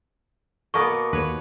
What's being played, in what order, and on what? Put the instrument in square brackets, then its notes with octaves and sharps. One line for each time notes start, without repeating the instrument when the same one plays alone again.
[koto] B2 A#3 B3 [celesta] C#6
[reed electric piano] D#2 [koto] B4 C#5